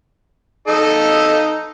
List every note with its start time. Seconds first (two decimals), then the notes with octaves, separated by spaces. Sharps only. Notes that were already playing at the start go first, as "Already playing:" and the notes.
0.68 D#4 A4 D#5